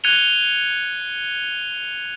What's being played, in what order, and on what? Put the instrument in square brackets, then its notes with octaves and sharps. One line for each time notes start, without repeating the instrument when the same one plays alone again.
[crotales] F#6 G#6 C#7 D#7 F7 G7